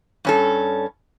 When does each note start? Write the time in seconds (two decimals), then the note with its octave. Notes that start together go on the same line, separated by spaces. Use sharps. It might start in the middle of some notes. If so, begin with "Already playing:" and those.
0.25 G2 C#4 A4